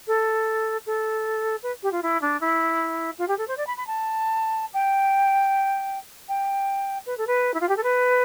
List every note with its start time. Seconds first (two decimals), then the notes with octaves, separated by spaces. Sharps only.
0.07 A4
0.86 A4
1.63 B4
1.83 G4
1.92 F4
2.02 E4
2.21 D4
2.41 E4
3.18 F4
3.28 G4
3.38 A4
3.48 C5
3.57 D5
3.67 B5
3.77 B5
3.87 A5
4.73 G5
6.28 G5
7.06 B4
7.17 A4
7.27 B4
7.54 E4
7.60 F4
7.69 G4
7.76 A4
7.83 B4